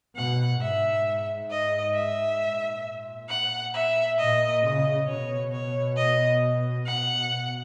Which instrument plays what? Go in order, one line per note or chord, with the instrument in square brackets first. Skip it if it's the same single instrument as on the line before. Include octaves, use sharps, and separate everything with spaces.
[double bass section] B2 [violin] F#5
[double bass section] G#2 [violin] E5
[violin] D#5
E5
[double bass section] A#2
[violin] F#5
E5
[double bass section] A#2 [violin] D#5
[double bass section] C#3 [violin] D#5
[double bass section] B2 [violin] C#5
[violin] C#5
D#5
[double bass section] B2 [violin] F#5
[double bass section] B2